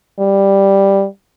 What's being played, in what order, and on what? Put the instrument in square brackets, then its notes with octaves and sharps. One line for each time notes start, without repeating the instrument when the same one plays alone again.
[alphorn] G3